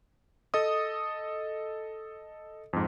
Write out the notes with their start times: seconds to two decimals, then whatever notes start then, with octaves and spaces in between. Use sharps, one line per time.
0.54 A4 D#5 D#6
2.73 F2 G#2